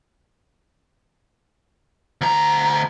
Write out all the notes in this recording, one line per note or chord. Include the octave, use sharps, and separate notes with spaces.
D2 A#5